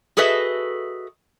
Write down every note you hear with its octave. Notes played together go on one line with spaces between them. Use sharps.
F#4 G#4 A4 B4 D#5 E5